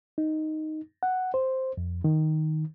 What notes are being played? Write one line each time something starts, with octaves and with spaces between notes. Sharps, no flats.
D#4
F#5
C5
F2
D#3